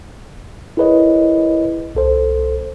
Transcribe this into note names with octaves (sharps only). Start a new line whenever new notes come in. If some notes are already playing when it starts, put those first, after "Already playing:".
E4 G#4 A#4 B4 C#5 D#5
C2 A4 C5